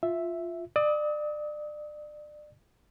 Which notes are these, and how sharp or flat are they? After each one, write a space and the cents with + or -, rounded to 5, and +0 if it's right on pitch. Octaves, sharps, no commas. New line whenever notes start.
F4 +0 E5 +0
D5 +30 D#6 +45